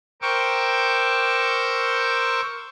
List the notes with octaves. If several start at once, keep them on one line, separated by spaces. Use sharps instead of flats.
A#4 C5 G5 C#6 D6 E6